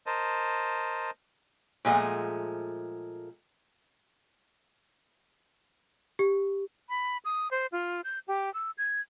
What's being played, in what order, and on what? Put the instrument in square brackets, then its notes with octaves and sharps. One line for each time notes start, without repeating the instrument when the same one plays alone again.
[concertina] A#4 C5 D#5 A5
[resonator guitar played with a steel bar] A#2 F3 G#3 A3 F#5
[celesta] G4
[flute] B5
D#6
C5
F4
G6
G4
E6
G#6